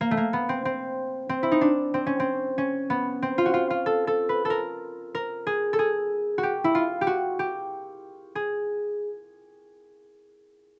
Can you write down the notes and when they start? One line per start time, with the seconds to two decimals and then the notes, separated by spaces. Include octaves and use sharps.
0.01 A#3
0.11 A3
0.17 A#3
0.33 B3
0.49 C4
0.65 C4
1.29 C4
1.43 E4
1.52 D#4
1.61 D4
1.94 C4
2.06 C#4
2.20 C4
2.58 C#4
2.90 B3
3.22 C4
3.38 F4
3.46 F#4
3.54 F4
3.70 F4
3.86 A4
4.07 A4
4.29 B4
4.45 A4
4.50 A#4
5.15 A#4
5.47 G#4
5.73 A4
5.79 G#4
6.38 F#4
6.43 G4
6.64 E4
6.75 F4
7.01 G4
7.07 F#4
7.39 G4
8.35 G#4